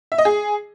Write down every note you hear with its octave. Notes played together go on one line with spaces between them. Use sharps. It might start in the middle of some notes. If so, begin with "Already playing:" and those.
E5
D#5
G#4